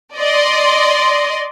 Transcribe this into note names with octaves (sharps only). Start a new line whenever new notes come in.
D5 D#5 C6